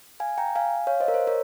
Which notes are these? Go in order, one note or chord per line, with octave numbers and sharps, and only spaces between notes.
F5 G#5
G5 A#5
F5 G#5
C#5 F5
C5 D#5
A#4
C5
A#4 C#5